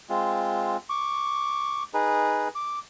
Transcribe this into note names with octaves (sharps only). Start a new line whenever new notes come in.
G#3 C4 F4
C#6 D6
D#4 G#4 B4
D6